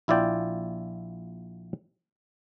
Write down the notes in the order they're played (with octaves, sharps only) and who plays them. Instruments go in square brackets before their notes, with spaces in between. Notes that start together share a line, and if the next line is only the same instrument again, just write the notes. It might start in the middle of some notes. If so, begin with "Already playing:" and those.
[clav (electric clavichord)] A#1 E4 F4 D5 G5